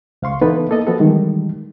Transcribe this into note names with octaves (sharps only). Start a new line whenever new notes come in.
C#2 F5 C6 C#6
E3 B3 D#4 E4 A4 B4
A#3 A4 D#5
F3 B3 F#4 A4
D#3 E3 G3 G#3